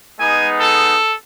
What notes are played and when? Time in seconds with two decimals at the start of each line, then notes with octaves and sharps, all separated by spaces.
0.20 G#3 B3 D#4 G#5
0.60 A4